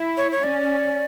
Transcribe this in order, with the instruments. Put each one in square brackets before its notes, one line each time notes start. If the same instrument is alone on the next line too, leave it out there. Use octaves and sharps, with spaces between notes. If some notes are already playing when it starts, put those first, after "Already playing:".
Already playing: [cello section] E4
[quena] C#5
C#5
[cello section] C#4 [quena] D5